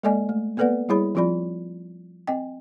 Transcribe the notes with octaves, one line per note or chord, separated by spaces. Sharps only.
G#3 A#3 A4 D5 D#5 G#5
A3
A#3 B3 A4 B4 D5 F#5
G3 E4 G#4 C#5 B5
F3 C4 F4 D5 B5
C4 D#5 G5